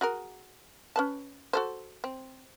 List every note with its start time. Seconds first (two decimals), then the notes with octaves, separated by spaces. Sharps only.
0.01 F#4 G#4 A#4
0.96 C#4 B4 A5
1.53 F#4 A4 C5
2.04 C4